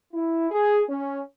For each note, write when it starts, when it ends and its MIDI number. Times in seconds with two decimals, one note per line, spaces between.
0.13 0.46 64
0.50 0.80 68
0.88 1.18 61